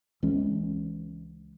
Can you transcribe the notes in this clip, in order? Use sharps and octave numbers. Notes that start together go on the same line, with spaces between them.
C#2 E3 G#3 C#4